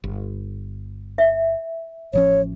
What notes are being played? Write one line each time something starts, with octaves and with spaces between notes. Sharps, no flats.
G1
E5
A1 F3 C#4 C#5